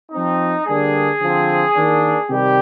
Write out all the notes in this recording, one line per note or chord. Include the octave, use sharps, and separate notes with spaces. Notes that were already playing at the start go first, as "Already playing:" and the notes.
F3 C4 D#4
D3 G3 A#3 D4 G#4
D3 F3 C4
D#3 A#3 D4
C3 D#3 G3 G4